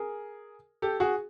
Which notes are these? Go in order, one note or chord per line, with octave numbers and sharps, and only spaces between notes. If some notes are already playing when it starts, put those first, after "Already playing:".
Already playing: G#4 A#4
G4 A4
F#4 G#4